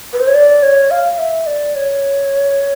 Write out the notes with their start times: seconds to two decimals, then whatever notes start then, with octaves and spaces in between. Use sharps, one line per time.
0.13 B4
0.20 C5
0.27 C#5
0.34 D5
0.63 C#5
0.91 F5
1.18 E5
1.47 D5
1.75 C#5